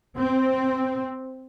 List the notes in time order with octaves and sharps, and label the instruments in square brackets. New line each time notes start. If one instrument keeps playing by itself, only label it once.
[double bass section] C4